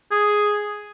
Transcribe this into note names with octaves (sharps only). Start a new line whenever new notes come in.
G#4